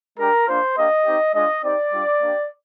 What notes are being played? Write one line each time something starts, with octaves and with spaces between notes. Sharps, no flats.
G#3 D4 G4 A#4
A#3 D4 F4 C5
A#3 D4 G4 D#5
C4 D#4 G4
G#3 D4 F4 D#5
C4 D#4 G4 D5
G3 D4 F4
A#3 D4 G4